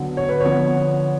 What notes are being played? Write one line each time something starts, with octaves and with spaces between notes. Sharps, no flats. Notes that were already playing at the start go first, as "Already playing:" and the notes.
Already playing: D3 F#3 B3
C#5
B4
D3 F3 B3 C#5